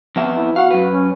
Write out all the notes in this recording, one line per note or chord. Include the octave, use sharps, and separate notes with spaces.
F2 B3 E5
E4
F#4 F5 F#5
F#2 B4
C#4